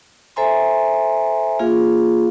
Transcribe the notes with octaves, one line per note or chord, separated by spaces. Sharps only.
A4 C5 E5 G#5 A#5 C6
A#3 F4 G#4 F5